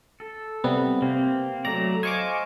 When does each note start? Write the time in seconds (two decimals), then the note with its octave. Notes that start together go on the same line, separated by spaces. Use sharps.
0.20 A4
0.64 C3 G3 B3
1.02 C3 A#3 C4
1.65 F#3 A3 D5 A#5
2.03 C5 D#5 F5 G#5 C#6 D6